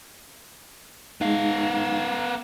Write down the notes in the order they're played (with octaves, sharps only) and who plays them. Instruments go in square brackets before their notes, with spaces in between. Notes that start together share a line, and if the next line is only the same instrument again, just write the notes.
[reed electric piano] G#3 D#4 [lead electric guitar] B3 F5